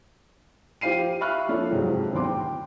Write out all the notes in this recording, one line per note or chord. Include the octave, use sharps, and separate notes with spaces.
F3 G4 C5 F5 C7 D#7
E5 F5 B5 C#6 F6 F#6
F3 A#3 D4 F4 A4 C#5
F2 G#2 C3 F3 F#3
G#1 D2 A2 B3 C6 D6
G5